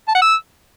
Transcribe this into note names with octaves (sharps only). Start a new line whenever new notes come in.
A5
F#5
E6